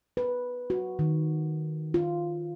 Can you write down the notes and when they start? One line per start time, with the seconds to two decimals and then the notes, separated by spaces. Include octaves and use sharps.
0.17 B4
0.70 F#4
0.99 D#3
1.94 F4